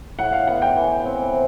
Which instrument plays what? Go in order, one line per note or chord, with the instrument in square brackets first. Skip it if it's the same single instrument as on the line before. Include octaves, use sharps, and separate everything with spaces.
[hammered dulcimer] A2 [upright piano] F#5
[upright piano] F5
[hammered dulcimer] B3 [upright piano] F#5
[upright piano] G5
[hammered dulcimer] E3
C4